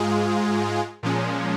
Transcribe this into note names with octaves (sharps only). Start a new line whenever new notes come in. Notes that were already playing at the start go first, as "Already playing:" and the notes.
Already playing: G#2 G#3 F4 G#4
A#2 F3 G#3 C#4